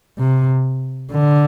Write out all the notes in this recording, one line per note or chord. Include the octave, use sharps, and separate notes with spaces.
C3
D3